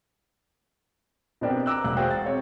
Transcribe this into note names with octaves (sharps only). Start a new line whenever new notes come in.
B2 B3 C4 D4 G4 A#4
A#5 D6 E6 F#6
E1 F#6
F#4 G#4 C5 D5 F5 G5
A6
C4 C#5